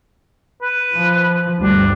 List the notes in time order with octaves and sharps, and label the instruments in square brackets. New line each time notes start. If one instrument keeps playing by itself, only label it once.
[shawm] B4
[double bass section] F3
[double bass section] G1 D2 G3 [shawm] D4